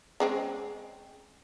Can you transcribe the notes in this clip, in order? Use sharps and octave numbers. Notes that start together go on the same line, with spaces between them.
C#3 G#3 C4